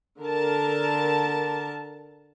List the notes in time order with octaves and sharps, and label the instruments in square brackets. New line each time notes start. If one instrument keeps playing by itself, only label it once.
[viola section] D3 A#4 A5